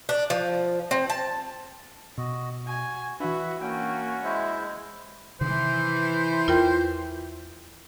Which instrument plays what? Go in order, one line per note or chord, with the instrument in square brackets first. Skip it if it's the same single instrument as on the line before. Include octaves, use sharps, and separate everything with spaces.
[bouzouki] D4
F3
C4
A5
[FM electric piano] B2 [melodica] F#4 D#5
[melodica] F#4 [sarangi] G#5
[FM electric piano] E3 D4 [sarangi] F#4 [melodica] B4 E5 B5
[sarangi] A#3 [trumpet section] C#4 F#4 [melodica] G5
[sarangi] G#3 [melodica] E4 C5 E5
[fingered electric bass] C3 D#3 [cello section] E3 [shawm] C5
[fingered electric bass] E2 [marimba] F4 A#4 G5